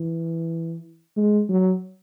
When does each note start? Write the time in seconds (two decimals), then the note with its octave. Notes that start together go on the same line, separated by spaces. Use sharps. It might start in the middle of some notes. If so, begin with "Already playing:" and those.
Already playing: E3
1.17 G#3
1.49 F#3